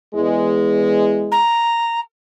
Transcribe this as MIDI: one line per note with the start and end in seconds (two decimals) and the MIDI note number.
0.14 1.41 40
0.14 1.41 56
1.31 1.99 82